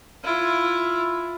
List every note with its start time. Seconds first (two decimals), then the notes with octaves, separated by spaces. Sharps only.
0.24 E4 F4